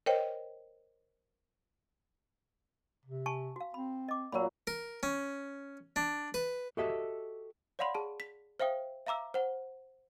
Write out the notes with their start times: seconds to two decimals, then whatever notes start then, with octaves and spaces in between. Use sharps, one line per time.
0.06 A#4 C5 C#5 D#5 G5
3.05 C3
3.26 G#5 A5 C#6
3.56 F#4 F5
3.74 C4 B5
4.08 D#5 D6
4.32 A#2 F#3 A#4 F5 B5
4.67 A#4
5.03 C#4
5.96 D4
6.34 B4
6.77 F#4 G4 A4 D#5 E5
7.79 C#5 D5 F5 F#5 B5 C6
7.95 G#4 A5
8.20 B6
8.60 C5 E5 F5 G5 D#6
9.06 E5 F5 A#5 D6 E6
9.34 C5 F#5